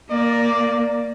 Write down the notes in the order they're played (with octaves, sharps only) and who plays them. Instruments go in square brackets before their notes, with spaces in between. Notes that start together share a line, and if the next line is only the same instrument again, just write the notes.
[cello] A#3 [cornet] D5